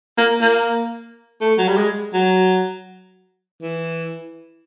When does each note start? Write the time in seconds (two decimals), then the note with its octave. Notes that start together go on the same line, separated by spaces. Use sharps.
0.18 A#3
0.41 A#3
1.41 A3
1.58 F#3
1.68 G3
1.77 G#3
2.14 F#3
3.62 E3